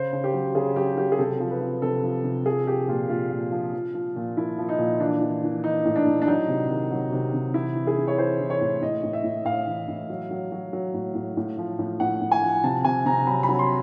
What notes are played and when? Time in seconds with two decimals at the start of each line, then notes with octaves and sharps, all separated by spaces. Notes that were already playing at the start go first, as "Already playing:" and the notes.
Already playing: C#3 C5
0.13 C#3
0.24 G4
0.33 F#3
0.55 C#3 G#4
0.76 F#3 G4
0.97 F#3 G4
1.12 G#4
1.18 C3 A4
1.40 F3
1.51 B4
1.61 F3
1.82 C3 A4
2.03 F3
2.24 C3
2.45 F3 G#4
2.67 F3 G4
2.88 A#2 F4
3.09 A#2 F4
3.31 A#2
3.51 F3
3.73 F3
3.94 F3
4.16 A#2
4.37 F3 E4
4.59 F3
4.69 D#4
4.79 A#2
5.00 E3 D4
5.21 E3
5.43 E3
5.64 E3 D#4
5.85 A2
5.96 D4
6.07 A2
6.22 D4
6.27 F#3 D#4
6.48 C3
6.69 D#3
6.92 F#3
7.12 C3
7.34 C3
7.54 E3 E4
7.76 E3
7.87 G#4
7.97 E3
8.08 C#5
8.18 E3 C5
8.40 E3
8.50 C#5
8.61 A2
8.82 A2 D#5
9.03 A2
9.13 E5
9.24 A2
9.45 A2 F5
9.67 E3
9.88 A2
10.10 F#3
10.31 F#3
10.52 F#3
10.73 F#3
10.94 A2
11.15 A2
11.37 A2
11.58 F3
11.79 A2
12.00 A2 F#5
12.22 A2
12.32 G#5
12.42 F3
12.64 C3 A5
12.85 C3 G#5
13.06 C3 A#5
13.27 F#3 B5
13.43 B5
13.49 F#3
13.59 C6